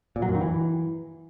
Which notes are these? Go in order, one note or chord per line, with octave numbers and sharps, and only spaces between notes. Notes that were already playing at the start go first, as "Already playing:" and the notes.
A#2
F#3
F#2
D#3
E3